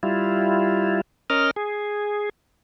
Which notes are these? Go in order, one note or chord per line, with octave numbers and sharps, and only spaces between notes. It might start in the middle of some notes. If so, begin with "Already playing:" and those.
G3 E4 F4
C#4 A#4 D#5 F6
G#4